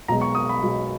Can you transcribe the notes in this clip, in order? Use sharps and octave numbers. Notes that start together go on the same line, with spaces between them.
B1 B2 G#3 A#5
C#6
D#6
B5
B1 B2 G#3